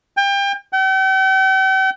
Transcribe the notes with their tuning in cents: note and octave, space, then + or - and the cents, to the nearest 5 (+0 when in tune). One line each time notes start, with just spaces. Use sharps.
G5 +30
G5 -45